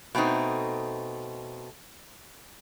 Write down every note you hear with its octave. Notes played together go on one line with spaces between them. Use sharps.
B2 A3 C4 D#4